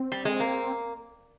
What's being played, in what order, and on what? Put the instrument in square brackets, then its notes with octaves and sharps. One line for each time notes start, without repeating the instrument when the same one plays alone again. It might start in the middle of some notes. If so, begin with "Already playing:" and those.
Already playing: [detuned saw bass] C4
[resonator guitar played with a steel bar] G3
G#3
A#3